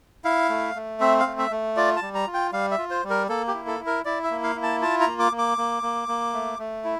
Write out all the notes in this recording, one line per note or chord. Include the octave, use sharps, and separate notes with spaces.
E4 F5
A3
A3
C4 E5
F5
A3
E5
A3
F4 D5
A5
G3
A#5
F4
G5
G3 F5
E5
F4
C5
G3
A#4
A#3 A4
G4
E4
A4
E4
A#4
E4 D5
E5
A#3
F5
E4
A5
F4 A5
A#5
A#3
D6
A#3
D6
A#3
A#3
A#3
A3
A3
E4